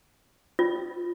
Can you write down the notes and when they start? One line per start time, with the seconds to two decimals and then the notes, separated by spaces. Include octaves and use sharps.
0.59 F4